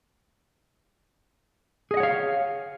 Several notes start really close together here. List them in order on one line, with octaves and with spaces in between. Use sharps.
G#4 D#5 F#5 C#5 F5